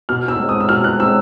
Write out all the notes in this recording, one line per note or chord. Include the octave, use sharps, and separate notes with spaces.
B2 F6
E6
G#3 C4
D#6
E6
B2 F6
F#6
G#3 C4 E6